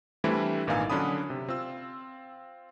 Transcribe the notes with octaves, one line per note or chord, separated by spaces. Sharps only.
E3 G3 A3 C4 D4 E4
G#1 A#2 E3 D#4 F5 G#5
D3 F#3 C#4 D4 B5 D#6
C3
C4 F4 E6